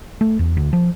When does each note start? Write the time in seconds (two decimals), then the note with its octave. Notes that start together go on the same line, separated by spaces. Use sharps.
0.21 A3
0.39 E2
0.57 D2
0.73 F3